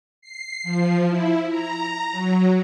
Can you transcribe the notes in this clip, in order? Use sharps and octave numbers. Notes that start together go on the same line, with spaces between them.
C7
F3
E4
A#5
F#3